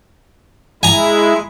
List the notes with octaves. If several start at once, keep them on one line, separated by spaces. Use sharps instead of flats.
G#3 E4 G#5 A#5